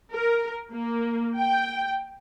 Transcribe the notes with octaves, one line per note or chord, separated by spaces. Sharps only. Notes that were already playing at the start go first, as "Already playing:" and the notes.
A#4
A#3
G5